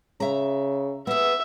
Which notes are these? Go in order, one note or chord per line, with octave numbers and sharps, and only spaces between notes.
C#3 E5 A#5
B3 G#4 E5